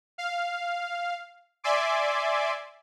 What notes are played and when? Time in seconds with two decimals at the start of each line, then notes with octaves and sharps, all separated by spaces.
0.18 F5
1.64 D5 E5 G#5 C6 D6